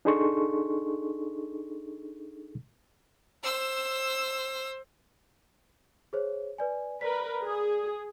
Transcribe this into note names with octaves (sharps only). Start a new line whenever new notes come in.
D4 D#4 G#4 A4 C6 C#6
C5 E6
G#4 C5 C#5
B4 D5 G#5
A#4 B4 D5 B6
G#4